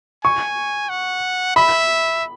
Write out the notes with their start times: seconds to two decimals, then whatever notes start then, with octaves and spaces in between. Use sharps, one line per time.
0.24 G#5 C#6
0.89 F#5
1.56 E5 B5